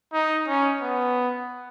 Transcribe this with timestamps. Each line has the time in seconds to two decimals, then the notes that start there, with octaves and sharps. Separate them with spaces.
0.13 D#4
0.48 C#4
0.81 B3